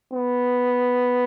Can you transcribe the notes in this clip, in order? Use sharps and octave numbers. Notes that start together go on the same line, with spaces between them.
B3